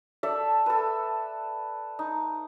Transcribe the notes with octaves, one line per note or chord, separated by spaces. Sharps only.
A4 D5 E5 A5
A4 B4
D#4